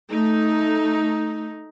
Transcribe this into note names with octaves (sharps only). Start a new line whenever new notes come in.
A3 D#4